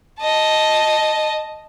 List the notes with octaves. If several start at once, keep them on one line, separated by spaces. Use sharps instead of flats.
D#5 A5